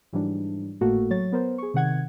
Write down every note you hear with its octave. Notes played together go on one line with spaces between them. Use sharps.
G#2 E3 F#3 G3 D4
G#1 A2 A3 A#3 F#4 A4
F#3 C#5 A6
B3 A#4 C5
G#4 C#6
C3 D#3 F#5 G#6